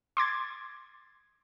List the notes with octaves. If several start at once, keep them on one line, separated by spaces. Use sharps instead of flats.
C6 D6 G#6 A6